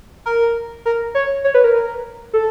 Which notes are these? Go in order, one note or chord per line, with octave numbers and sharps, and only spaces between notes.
A#4
A#4
C#5
C#5
B4
A#4
A4